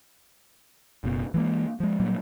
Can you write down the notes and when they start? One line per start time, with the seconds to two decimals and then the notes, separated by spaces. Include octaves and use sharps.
1.04 F#1 B2
1.34 E3 G#3 A#3
1.80 F3 G#3
2.00 A#2 F#3 G3 A#3